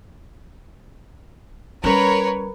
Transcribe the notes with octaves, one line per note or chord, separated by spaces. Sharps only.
G3 C#4 A#4 B4 C#5